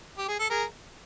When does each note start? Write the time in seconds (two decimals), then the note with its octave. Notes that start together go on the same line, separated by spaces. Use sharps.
0.17 G4
0.28 G#4
0.39 A4
0.49 G#4 A#4